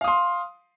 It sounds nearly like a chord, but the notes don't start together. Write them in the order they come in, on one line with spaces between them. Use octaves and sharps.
F5 D#6 C6